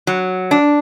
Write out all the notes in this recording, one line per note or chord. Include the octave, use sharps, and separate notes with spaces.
F#3
D4